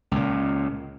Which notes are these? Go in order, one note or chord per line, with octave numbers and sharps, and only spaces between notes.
C#2 A#2